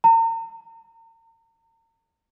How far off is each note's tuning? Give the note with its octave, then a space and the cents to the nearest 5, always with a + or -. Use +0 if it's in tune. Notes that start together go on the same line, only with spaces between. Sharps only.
A#5 -40